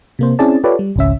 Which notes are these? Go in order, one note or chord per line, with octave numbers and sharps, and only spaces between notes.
C3 A#3 C5
C4 C#4 E4 G#4 D5 A5
F4 G4 A4 B4 C#5 D5
G3
G#1 C#2 C#4 E5